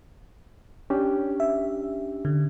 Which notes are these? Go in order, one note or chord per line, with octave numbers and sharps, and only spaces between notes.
C#4 D4 G4
E5
D3